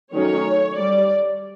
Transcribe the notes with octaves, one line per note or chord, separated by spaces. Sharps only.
D#3 F#3 A3 C#4 C#5
G3 D5